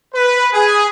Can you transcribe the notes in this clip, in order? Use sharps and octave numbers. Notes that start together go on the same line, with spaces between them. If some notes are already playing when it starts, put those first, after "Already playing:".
B4
G#4